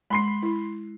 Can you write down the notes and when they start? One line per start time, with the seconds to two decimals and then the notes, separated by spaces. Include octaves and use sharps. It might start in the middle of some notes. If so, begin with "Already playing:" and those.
0.10 G#3 B5 C6 C7
0.43 E4